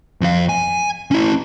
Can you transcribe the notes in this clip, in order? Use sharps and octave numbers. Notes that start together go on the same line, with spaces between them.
F2 F5
G#5
C#4 E4